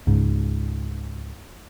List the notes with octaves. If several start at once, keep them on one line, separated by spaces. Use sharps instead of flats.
C#2 G#2